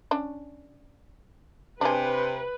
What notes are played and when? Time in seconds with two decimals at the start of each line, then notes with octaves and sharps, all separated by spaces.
0.11 C#4 D4
1.81 C3 D4 G#4 B4